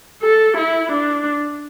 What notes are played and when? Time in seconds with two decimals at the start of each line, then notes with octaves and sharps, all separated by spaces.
0.23 A4
0.57 E4
0.92 D4